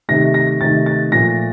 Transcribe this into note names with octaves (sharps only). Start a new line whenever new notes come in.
C3 D#3 A3 A#6
A#6
C3 D#3 A3 A6
A6
A#2 F3 A3 A#6